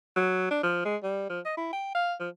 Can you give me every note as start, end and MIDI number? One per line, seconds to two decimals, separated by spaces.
0.16 0.49 54
0.51 0.59 62
0.63 0.83 53
0.85 0.97 56
1.03 1.27 55
1.30 1.40 53
1.45 1.56 75
1.57 1.71 64
1.73 1.92 79
1.95 2.14 77
2.20 2.29 53